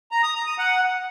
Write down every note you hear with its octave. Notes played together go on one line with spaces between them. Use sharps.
A#5
D#6
A#5
D#6
F#5